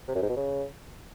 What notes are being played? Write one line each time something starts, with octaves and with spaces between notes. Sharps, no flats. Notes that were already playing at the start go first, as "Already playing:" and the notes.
C3
F#2
G#2
B2
C#3